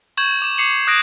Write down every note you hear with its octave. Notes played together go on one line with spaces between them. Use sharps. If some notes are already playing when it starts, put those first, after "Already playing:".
C#6 G6 G#6 E7 F#7
D6 E7
D6 C7 C#7 F#7
D#6 F#6 G#6 A#6 D7